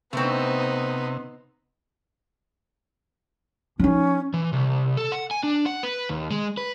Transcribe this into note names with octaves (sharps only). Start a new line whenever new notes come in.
C3 A3 B3 C4 D#4
F3 C#4 D#4
E3
C2
A4
F#5
G#5
D4
F#5
B4
D#2
G#3
B4